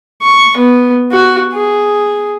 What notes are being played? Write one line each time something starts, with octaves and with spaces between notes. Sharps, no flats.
C#6
B3
F#4
G#4